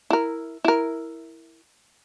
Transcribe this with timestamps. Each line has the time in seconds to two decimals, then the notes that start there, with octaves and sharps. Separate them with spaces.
0.10 E4 A#4
0.64 E4 A#4